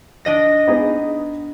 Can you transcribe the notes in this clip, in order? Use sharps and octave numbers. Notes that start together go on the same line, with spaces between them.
D4 D#5 A#6
B3 D#4 G#4